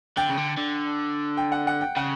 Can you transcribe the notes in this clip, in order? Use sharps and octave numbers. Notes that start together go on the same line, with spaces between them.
D3 G5
C#3
D3
D3
G5
F#5
F#5
G5
C#3 F#5